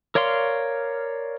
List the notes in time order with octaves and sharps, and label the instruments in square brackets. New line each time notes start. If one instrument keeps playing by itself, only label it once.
[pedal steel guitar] A#4 C#5 D5 F5 C6